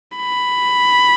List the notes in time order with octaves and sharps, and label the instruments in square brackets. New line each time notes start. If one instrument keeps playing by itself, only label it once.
[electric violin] B5